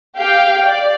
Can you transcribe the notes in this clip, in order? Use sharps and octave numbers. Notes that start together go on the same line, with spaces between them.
G4 F5 G5 G6
D5